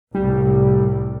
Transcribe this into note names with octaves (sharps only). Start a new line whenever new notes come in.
C2 A2 G3